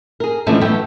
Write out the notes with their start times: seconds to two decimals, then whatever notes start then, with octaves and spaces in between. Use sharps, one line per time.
0.20 G#4 A#4
0.46 D3 E3 F3 G#3 A3 C#4
0.61 F#2 E3 A3 B3 G5